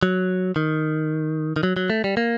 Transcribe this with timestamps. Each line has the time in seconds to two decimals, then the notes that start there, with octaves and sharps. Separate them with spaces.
0.03 F#3
0.56 D#3
1.56 D#3
1.63 F#3
1.77 F#3
1.90 A3
2.04 G3
2.17 A#3